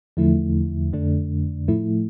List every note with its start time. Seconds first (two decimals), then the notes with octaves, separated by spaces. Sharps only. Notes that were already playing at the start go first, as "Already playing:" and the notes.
0.17 E2 D3 F3 A3 E4
0.93 F2 D3 A3 D4
1.68 A2 F3 A3 E4